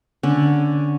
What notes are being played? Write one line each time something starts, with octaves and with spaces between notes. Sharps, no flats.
D3 C#4